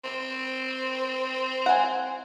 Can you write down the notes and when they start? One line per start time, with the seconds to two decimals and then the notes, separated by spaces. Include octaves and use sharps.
0.05 C4
1.66 F#5 G#5